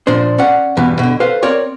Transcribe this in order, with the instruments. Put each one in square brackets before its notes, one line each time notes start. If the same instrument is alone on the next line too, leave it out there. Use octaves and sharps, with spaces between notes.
[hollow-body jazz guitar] A#2 F3 D4 C5
C#4 D5 F#5
E2 G2 B2 E3
B2 D3
A4 B4 C5 F5
C4 A#4 C#5 D5